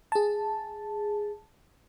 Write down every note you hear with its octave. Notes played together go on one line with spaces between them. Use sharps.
G#4 A5